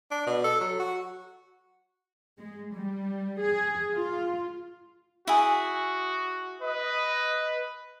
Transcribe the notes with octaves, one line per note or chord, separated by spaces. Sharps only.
D4
B2
A4
F#3
F#4
G#3
G3
G#4
F4
E4 F#4 G#4
B4 D#5